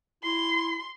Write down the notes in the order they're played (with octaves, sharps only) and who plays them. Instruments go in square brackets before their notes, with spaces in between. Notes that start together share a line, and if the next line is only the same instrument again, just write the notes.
[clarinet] E4 [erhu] C6